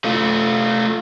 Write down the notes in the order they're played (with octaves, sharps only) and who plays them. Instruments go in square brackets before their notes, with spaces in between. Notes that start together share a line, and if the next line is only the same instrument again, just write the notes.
[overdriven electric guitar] A3 F4